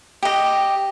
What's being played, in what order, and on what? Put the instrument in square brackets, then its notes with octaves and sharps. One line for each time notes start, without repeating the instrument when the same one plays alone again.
[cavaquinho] G4 D#5